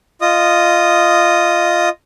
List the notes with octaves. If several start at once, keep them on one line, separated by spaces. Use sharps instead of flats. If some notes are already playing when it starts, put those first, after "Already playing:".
F4 D#5 D#6